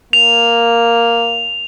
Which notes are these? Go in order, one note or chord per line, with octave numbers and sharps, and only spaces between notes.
A#3 F7